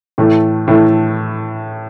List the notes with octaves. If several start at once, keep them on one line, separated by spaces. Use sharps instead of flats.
A2 E3 A3
A2 E3 A3